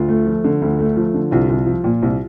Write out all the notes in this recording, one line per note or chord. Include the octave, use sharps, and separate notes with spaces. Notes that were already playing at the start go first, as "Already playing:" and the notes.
Already playing: D2 F4
A3
F3
D3
D2
A3
F3
D3
C2 F4
C2
F3
A#2
C2